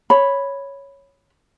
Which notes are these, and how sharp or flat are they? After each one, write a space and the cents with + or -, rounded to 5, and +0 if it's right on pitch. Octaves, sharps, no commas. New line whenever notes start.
C#5 +0 B5 +0